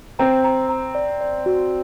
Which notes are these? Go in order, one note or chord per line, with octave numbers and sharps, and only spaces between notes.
C4 A#5
A#5
A#5
D5
D5
F#4